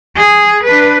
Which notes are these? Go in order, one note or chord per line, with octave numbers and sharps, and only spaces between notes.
G#4
D4 B4